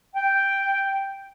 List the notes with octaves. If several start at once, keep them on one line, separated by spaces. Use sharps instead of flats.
G5